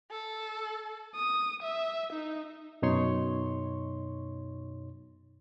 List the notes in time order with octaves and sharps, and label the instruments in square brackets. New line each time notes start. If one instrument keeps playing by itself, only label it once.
[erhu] A4
[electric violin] D#6
E5
D#4
[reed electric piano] F#2 B2 D#4 C#5 C6 C#6